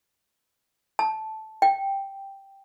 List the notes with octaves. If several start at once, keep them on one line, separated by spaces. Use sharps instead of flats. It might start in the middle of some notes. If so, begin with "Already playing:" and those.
A5
G5